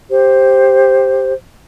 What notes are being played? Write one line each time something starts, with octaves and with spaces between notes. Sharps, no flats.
G4 C5